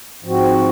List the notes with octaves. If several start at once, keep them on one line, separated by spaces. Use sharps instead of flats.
G#2 F3 C4 F#4